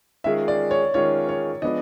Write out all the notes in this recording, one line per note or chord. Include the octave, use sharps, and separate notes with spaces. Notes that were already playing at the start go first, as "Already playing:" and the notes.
D#3 G#3 C#4 F4 G#4 E5
D5
C#5
D#3 G#3 C#4 F4 G#4 C#5
C#5
F3 G#3 B3 D4 F4 D#5